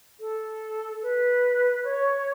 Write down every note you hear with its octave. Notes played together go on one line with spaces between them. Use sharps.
A4
B4
C#5